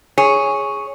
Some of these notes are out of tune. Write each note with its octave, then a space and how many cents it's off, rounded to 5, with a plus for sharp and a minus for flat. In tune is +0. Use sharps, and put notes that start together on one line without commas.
G#4 +0 C#5 +0